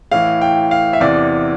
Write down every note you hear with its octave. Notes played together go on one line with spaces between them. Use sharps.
A2 E3 F5
G5
F5
E5
E2 C3 E3 D5